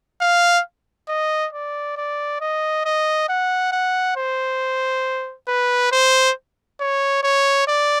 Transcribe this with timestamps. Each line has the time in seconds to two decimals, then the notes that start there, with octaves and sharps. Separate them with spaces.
0.21 F5
1.08 D#5
1.53 D5
1.97 D5
2.41 D#5
2.85 D#5
3.29 F#5
3.72 F#5
4.16 C5
5.48 B4
5.92 C5
6.80 C#5
7.23 C#5
7.67 D5